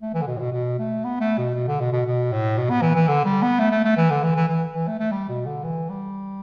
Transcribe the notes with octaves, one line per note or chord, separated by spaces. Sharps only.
A3
E3
D3
B2
A2
B2
B2
A3
B3
A3
B2
B2
D3
B2
B2
B2
A2
B2
B3
E3
E3
D3
G3
B3
A3
A3
A3
E3
D3
E3
E3
E3
E3
A3
A3
G3
B2
D3
E3
G3